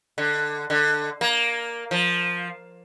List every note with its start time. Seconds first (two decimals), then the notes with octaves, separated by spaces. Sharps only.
0.18 D3
0.70 D3
1.21 A#3
1.91 F3